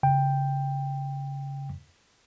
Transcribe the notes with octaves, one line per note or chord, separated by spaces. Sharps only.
C#3 G5